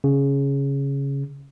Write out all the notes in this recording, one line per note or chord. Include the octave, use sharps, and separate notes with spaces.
C#3